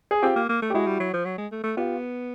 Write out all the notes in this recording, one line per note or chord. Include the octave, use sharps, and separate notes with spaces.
G#4
C4 F4 G4
A#3
A#3
A3
G4
G#3 E4 F#4
G3
F#3
F3
F#3
G#3
A3
A3
B3 F4 G4